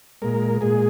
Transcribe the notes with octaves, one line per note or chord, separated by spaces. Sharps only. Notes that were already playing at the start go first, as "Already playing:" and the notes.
A#2 G#3 A#4
A#2 G#3 G#4